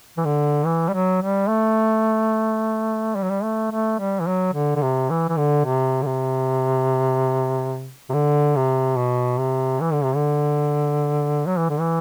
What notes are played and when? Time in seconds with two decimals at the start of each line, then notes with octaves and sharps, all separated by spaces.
0.17 E3
0.25 D3
0.65 E3
0.89 G3
0.93 F#3
1.22 G3
1.49 A3
3.15 G3
3.23 F#3
3.30 G3
3.43 A3
3.71 A3
3.99 G3
4.20 E3
4.27 F#3
4.53 D3
4.76 D3
4.82 C3
5.10 E3
5.29 E3
5.37 D3
5.65 C3
6.02 D3
6.06 C3
8.10 C3
8.14 D3
8.56 C3
8.97 B2
9.40 C3
9.80 E3
9.93 D3
10.03 C3
10.15 D3
11.46 F#3
11.58 E3
11.69 D3
11.80 E3